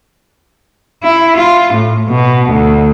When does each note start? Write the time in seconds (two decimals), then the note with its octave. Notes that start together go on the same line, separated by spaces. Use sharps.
1.03 E4
1.37 F4
1.74 A2
2.09 B2
2.50 D2